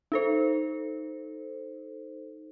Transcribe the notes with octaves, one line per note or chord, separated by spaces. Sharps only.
D#4 A4 C5